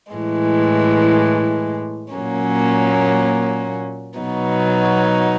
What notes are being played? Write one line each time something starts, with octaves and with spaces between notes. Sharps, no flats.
A2 E3 G#3
A#2 F#3 A#3 C#4
B2 F#3 B3 D#4